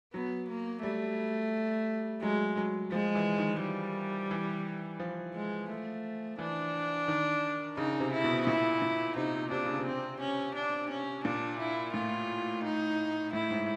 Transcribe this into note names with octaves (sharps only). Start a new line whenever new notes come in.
F#3 B3
A#3
G3 A3
F#3 G#3
F#3
F3 G#3
E3
D#3
G3
E3
F3
G#3
A3
E3 D4
D#3
C#3 D#4
C3
E4
B2
A#2 E4
A#2
C3 D#4
C3 D4
C#3
C3
C4
C#4
D4
C#4
A#2 D4
E4
A2 F4
D#4
A2 E4
G#2